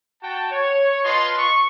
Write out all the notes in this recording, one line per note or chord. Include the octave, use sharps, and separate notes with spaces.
F#4 G5 A5
C#5
F4 B4 D#5 A5 C6
C#6